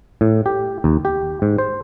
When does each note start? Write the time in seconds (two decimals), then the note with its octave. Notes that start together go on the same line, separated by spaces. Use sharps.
0.21 A2
0.46 G4
0.84 D#2
1.05 G4
1.42 G#2
1.59 C5